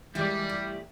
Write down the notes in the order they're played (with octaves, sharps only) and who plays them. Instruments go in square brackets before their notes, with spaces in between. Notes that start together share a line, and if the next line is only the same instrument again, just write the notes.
[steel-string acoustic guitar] E3 G#3 A#3 [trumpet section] G3 [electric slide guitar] E4 G4 D5
[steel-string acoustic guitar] A3